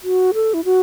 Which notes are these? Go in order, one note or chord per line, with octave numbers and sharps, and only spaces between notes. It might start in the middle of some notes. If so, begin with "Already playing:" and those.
F#4
A4
E4
F#4